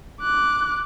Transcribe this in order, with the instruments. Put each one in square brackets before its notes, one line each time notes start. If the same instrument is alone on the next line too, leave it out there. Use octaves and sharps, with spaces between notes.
[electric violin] D6 F#6